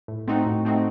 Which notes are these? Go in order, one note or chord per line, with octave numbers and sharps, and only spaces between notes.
A2
A3 C4 D#4 F#4
A2
A3 C4 D#4 F#4